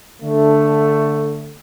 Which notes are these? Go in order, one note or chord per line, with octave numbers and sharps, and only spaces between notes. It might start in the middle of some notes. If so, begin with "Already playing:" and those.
D3 A3